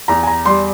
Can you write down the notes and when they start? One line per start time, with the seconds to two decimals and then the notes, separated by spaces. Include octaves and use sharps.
0.08 E2 A#5
0.23 G#5
0.27 A#5
0.45 G3 C6